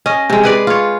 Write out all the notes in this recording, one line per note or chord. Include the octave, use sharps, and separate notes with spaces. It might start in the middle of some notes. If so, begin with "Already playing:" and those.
C#4 D#5
C3 G#3
G#4 B4 D5
F4 C#5